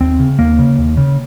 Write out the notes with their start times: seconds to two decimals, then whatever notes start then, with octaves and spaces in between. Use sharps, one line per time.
0.01 D#2 C4
0.20 C#3
0.39 D#2 A#3
0.59 C#3
0.78 D#2
0.97 C#3